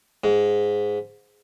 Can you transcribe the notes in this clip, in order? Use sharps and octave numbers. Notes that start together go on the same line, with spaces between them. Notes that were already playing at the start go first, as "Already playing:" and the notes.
G#2